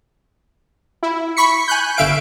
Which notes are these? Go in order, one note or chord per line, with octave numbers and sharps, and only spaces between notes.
E4
B5 C#6 B6 C#7
G#5 F#6 G6
G1 D3 E5 F5 D7